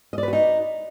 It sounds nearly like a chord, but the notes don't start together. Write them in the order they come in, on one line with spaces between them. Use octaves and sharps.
D#5 D5 B4 F#4 D#4